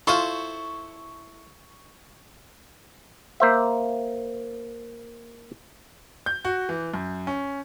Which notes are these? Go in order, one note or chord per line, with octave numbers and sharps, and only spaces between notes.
E4 F4 A4 C5 C6 C#6
A#3 C5 E5
G6
F#4
E3
F#2
C#4